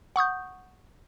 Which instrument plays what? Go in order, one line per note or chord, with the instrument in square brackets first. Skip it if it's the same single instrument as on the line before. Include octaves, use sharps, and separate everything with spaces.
[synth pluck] F#5 C#6 D#6 G6